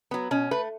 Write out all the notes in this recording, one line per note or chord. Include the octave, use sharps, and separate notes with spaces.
F#3 B3
B2 C#4
A3 B4